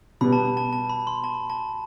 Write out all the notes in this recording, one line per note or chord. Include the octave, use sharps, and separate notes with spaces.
B2 G3 B3 B5
A5
A5
A5
B5
C6
A5
A5